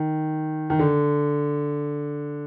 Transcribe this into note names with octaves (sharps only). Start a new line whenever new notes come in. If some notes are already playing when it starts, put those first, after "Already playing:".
Already playing: D#3
D#3
D3